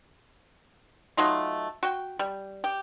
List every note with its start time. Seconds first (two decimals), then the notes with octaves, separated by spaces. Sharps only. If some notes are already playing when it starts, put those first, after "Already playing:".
1.17 F#3 A3 D#4 F4
1.83 F#4 G5
2.19 G3
2.64 G4